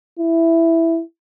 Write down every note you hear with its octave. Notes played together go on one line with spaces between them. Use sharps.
E4